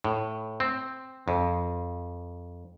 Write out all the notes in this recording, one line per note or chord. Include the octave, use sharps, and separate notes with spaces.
A2
C4
F2